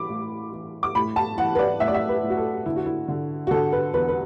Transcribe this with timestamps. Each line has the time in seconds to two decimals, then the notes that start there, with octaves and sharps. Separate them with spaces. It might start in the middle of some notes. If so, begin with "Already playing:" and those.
Already playing: E3 B5 D6
0.10 A2
0.53 E3
0.83 D6
0.95 A2 B5
1.16 A5
1.38 E3 F#5
1.55 B4
1.59 D5
1.80 A2 E5
1.88 D5
1.94 E5
2.09 B4
2.23 A2
2.30 F#4
2.37 A4
2.66 D3 E4
2.76 F#4
2.86 E4
3.08 D3
3.47 F#4
3.51 D3 A4
3.72 B4
3.94 E2 B4
4.09 B4